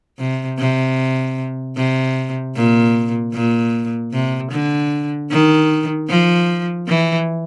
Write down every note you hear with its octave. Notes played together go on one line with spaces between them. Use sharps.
C3
C3
C3
A#2
A#2
C3
D3
D#3
F3
E3